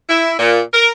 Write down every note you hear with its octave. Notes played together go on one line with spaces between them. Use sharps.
E4
A#2
A#4